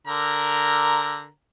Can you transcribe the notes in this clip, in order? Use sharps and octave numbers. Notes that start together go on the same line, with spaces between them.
D3 A#4 A#5